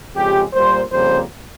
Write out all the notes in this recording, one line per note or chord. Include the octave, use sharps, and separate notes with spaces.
F2 C#3 G#3 G4
A#2 G3 A#3 C5
F2 C#3 G3 A#3 C5